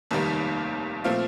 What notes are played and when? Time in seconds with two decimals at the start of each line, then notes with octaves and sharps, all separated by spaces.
0.11 F1 D#2 D#3 G3 A#3
1.04 A#2 F3 A3 C4 F5